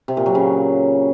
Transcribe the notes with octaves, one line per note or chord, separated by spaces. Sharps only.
C3
A#2
F#3
C#3